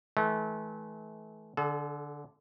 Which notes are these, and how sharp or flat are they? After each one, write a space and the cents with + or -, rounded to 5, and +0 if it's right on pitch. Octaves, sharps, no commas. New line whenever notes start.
E3 -30 A3 -35
D3 +0 A4 -45